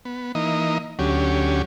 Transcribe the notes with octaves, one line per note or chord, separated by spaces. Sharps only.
B3
E3 A#3 D#4 D#5
D2 F#3 C#4 G4